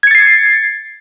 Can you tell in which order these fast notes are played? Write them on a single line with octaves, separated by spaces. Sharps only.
G#6 C#7 A6 C7